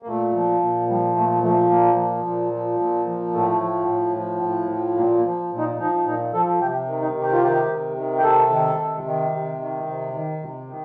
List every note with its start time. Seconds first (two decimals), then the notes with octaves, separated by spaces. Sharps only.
0.03 A#3
0.08 A#2 A3
0.35 F3
0.61 A#2
0.89 F3 G3
1.16 A#2 A3
1.43 F3 A3
1.70 A#2 A#3
1.98 F3
2.25 A#2
2.52 F3
2.80 A#2
3.06 F3
3.33 A2 A3
3.61 F3
3.88 A2
4.16 F3
4.43 A2
4.70 F3
4.97 A#2 A#3
5.18 A#3
5.25 F3
5.52 A#2
5.58 D#4
5.79 F3 D#4
6.05 A#2 D#4
6.34 F3 A4
6.60 C3 G4
6.88 D#3
7.02 D#4
7.15 C3
7.22 G4
7.32 F4
7.43 D#3 G4
7.69 C3
7.97 D#3
8.18 G4
8.23 C3 A4
8.51 D#3
8.79 C3
9.05 D#3
9.32 C3
9.60 D#3
9.87 C3
10.14 D#3
10.42 C3
10.69 D#3